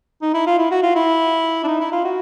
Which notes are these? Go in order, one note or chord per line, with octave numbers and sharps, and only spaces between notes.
D#4
E4
F4
E4
F#4
F4
E4
D4
D#4
E4
F4
F#4